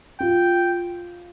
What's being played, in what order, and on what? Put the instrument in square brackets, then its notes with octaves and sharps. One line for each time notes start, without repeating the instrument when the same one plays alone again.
[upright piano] F4 [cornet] G5